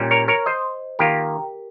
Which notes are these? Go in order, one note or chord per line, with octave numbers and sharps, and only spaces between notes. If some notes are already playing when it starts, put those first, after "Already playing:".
Already playing: A#2 G3 C#4
A#4 C#5
A#4 C#5
C5 D#5
D#3 A#3 F4 G4 A#4